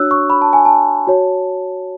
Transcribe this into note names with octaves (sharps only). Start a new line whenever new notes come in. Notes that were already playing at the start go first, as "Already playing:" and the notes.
Already playing: D4 F#4 C#5 E6 F#6
C#6
B5
A5
G#5
A5
F#4 C#5